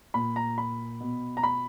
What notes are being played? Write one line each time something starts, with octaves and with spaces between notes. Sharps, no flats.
A#2 B5
A#5
B5
B2
A#5
B5